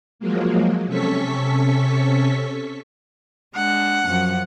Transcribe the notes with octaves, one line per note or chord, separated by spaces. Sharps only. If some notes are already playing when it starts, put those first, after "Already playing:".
F3 F#3 G#3 A#3
C3 C#4 A4 C#6 B6
G#3 D4 F#5
F#2 F3